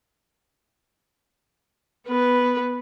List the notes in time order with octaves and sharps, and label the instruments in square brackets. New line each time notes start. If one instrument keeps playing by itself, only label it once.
[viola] B3 B4